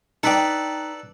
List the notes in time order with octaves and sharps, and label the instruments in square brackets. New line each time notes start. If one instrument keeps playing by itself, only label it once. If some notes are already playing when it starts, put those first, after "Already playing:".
[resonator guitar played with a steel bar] D#4 G5 [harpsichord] A4 B4 D5